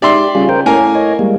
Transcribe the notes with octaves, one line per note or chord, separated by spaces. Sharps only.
G#2 G4 D5 E5 C6
C#3 G3 F4 G#4
A#4 C5 G5
A2 A#3 C#4 A#4 G#5
C#5 D#5
G3 G#3 A#3